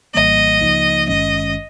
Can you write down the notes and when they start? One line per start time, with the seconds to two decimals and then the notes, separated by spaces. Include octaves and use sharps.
0.15 A#1 A2 E3 G3 A#3 D#5
0.61 C#2 C#3 F3 A#3 D#4
1.08 G#1 G2 D#3 G#3 C#4 D#5